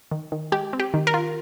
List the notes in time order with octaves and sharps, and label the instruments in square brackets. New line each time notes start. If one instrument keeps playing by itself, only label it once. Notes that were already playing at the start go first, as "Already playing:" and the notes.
[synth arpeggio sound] D#3
D#3
G#3 G4
C4
G4
D#3
A#4
F4